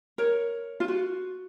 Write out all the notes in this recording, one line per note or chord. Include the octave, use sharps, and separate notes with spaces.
A#4 C#5
F4
F#4